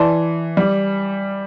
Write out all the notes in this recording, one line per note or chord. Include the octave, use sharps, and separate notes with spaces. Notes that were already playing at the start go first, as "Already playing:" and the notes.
Already playing: E3 D5 A5 C6
G3